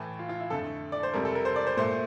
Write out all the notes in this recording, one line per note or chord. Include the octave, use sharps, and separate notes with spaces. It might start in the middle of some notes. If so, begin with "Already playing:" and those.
Already playing: A2 E3 A3
F4
F4
E4
F2 D3 A3 A4
D5
C5
F2 C3 G3 A#4
A4
A#4
C5
D5
C5
A#2 A3 C5